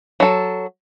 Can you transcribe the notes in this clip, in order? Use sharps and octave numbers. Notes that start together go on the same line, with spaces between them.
F#3 A4